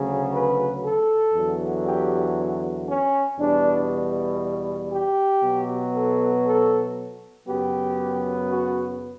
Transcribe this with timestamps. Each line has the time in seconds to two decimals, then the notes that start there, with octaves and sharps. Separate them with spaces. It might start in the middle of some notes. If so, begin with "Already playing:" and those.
Already playing: D2 C#3 F#3
0.32 B4
0.83 A4
1.34 E2 D3 F#3
1.86 G4
2.87 C#4
3.38 E2 B2 G3 D4
4.91 G4
5.43 B2 F#3 B3
5.93 A4
6.45 A4
7.46 F#2 C#3 F#3 B3 G4
8.48 F#4